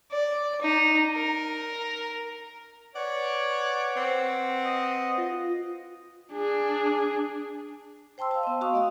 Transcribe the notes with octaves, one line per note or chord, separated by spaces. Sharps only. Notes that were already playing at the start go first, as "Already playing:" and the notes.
D5
D#4
A#4
B4 C#5 D5 F#5
C4
D#5
F4
D4 G#4
C5 G5 A5 C6 E6
F5 A5
B3 D#5
F#4 F5 C#6 D#6
A3 D#5 F5